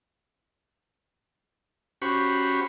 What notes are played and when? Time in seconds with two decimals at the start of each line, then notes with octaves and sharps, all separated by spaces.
2.02 C#4 F#4 G4 C5 B5 C#6